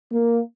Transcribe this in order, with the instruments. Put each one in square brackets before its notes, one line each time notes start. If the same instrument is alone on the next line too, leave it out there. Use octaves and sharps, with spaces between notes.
[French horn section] A#3